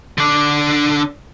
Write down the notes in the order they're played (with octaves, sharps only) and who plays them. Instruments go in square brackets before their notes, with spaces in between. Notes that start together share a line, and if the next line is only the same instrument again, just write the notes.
[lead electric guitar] D3 D4